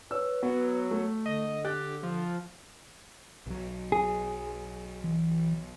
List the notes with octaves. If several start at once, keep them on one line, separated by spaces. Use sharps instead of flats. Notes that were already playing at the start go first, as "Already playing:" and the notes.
B4 C#5 E6
F#3 B3
A3
D3 D#5
G4 F#6 A6
F3
B1 F#3
G#4
E3